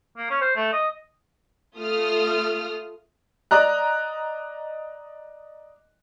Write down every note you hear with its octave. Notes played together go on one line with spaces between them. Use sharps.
A#3
C#4
C5
A3
D#5
A3 F4 D#6 F6
D5 D#5 A#5 F#6